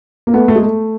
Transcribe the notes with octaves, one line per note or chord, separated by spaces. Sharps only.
A#3
A3 B3
A3
G#3
A3